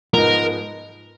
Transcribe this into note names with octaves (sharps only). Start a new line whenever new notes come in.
G#2 F3 G#3 B3 D#4 A#4